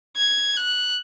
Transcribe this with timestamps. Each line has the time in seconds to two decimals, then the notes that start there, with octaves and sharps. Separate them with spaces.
0.17 G#6
0.56 F#6